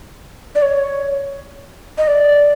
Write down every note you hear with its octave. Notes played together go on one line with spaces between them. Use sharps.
D5
C#5
D#5
D5